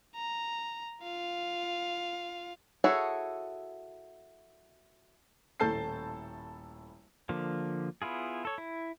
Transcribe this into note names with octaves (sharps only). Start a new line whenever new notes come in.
A#5
F4 F5
E4 F#4 G#4 A4 C#5
D#1 A2 A4 A5 G6 C7
D3 F3 A#3
B3 E4 F4 G#4
A4 C#5
E4